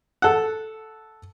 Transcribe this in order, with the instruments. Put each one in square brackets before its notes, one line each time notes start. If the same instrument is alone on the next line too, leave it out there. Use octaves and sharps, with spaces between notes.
[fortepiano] A4 F#5